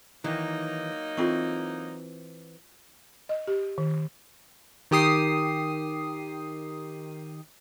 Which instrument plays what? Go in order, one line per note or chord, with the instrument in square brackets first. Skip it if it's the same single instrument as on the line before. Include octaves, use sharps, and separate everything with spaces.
[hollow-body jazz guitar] D#3 E3 [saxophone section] F#3 A#3 D#4
[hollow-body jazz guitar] E3 C4 [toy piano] F4 A4 C#6
[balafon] D#5
G4
D#3
[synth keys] D#3 G4 D#6 C7